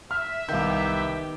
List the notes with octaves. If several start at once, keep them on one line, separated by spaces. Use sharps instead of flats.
E5 F6
C2 D#3 B3 G4 F5 G6